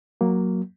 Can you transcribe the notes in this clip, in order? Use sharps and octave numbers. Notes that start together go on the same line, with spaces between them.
F#3 A#3